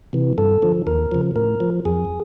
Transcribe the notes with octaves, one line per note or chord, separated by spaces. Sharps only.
C3 E3
G2 A4
D3 F3
D#2 A#4
C#3 F3
A2 A#4
F3
F2 G#4